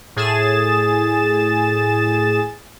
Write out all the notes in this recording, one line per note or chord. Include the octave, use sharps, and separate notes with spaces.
A2 G#4 A6 E7